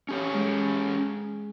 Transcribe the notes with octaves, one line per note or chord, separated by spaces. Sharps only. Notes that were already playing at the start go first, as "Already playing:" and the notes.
C#4 G4 C#5
G#3